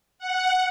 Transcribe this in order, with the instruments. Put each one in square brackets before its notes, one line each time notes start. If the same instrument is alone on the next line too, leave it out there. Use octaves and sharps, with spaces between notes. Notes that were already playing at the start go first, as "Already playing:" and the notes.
[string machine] F#5